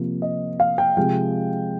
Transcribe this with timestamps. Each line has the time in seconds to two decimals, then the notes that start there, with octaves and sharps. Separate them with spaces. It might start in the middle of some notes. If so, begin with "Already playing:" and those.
Already playing: C3 F3 A#3
0.22 D#5
0.60 F5
0.78 G5
0.97 C3 F3 G#3 G5